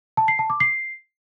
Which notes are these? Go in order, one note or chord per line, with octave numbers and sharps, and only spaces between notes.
A5
C7
A5
D6
C7